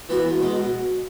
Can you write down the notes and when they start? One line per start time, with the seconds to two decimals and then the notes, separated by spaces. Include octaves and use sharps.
0.09 E3 B3 F#4
0.24 E2
0.41 B2 G#3
0.55 B2